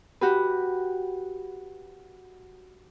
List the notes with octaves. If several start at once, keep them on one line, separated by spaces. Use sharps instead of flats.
F#4 G4 B4